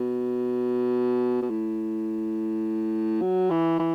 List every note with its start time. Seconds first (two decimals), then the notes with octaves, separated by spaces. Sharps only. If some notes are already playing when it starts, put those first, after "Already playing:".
Already playing: B2
1.42 B2
1.50 A2
3.22 F#3
3.50 E3
3.79 E3